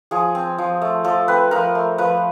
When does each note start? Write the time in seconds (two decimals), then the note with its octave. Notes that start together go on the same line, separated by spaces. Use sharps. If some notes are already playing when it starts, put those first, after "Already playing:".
0.11 F3 G#4
0.35 C4
0.58 F3
0.82 A3
1.04 F3 A4
1.28 C4 B4
1.51 F3 A#4
1.75 A3
1.98 F3 B4